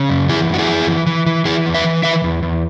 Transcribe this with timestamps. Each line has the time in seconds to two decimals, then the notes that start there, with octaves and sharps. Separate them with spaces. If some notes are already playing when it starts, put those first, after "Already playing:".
Already playing: C#3
0.10 F#2
0.29 E3 E4 G#4
0.49 F#2 F#4
0.58 E4 G#4
0.69 E3
0.87 E3
1.07 E3
1.26 E3
1.45 E3 E4 G#4
1.66 E2
1.74 B4 E5
1.84 E3
2.03 E3 B4 E5
2.24 E2
2.43 E2